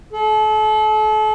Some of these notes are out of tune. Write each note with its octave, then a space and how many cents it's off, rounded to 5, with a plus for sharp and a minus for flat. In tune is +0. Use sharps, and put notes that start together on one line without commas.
A4 -35